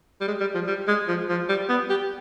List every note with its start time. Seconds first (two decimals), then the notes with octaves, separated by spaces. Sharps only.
0.21 G3
0.28 G#3
0.40 G3
0.54 F3
0.67 G3
0.88 G#3
1.08 F3
1.29 F3
1.49 G3
1.69 B3
1.90 G4